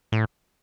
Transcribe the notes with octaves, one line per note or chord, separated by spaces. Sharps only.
A2